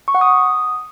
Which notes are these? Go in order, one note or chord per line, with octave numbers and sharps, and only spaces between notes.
C#6
F#5
D#6